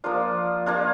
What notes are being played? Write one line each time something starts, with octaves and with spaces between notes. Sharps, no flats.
F3 A#3 D4 F4 F5
A#3 D4 F4